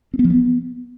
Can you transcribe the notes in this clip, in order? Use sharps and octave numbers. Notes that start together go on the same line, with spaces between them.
C4
B3
F3
B3